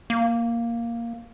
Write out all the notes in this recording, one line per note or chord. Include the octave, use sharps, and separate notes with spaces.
A#3